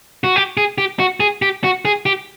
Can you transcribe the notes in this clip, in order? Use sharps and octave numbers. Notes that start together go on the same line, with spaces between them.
F#4
G4
G#4
G4
F#4
G#4
G4
F#4
G#4
G4